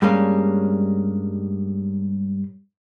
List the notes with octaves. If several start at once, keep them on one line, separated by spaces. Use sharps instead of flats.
G2 G3 G#3 A#3 C#4